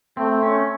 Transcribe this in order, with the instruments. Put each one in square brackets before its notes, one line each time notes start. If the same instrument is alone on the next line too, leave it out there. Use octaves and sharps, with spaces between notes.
[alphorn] A3 [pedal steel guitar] C4
[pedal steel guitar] C#4